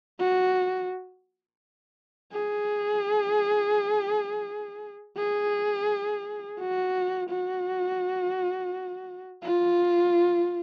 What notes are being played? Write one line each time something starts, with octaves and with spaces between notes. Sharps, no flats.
F#4
G#4
G#4
F#4
F#4
F4